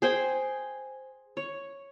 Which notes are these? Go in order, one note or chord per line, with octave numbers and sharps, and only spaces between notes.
G#4 C5 G5 G#5
C#5